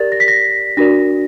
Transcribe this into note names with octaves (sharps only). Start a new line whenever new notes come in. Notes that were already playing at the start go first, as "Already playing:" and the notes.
Already playing: G4 A#4 D5 A6
A#6
B6
A#6
D4 F#4 A#4 D5 A#6